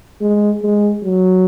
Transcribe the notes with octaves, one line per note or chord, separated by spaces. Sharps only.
G#3
G#3
F#3